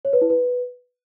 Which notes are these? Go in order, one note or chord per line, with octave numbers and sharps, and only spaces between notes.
C#5
B4
E4
B4